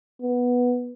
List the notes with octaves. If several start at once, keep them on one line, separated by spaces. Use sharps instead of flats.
B3